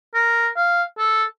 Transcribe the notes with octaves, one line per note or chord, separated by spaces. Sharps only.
A#4
F5
A4